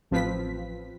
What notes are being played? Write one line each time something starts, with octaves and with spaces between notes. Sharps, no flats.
A1 F3 C4 F4 B4 B6